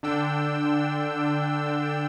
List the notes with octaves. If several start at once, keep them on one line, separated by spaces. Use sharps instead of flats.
D3 D4 G5 E6